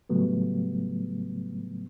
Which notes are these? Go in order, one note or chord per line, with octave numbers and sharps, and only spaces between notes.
A2 C#3 F#3 G3 A3 B3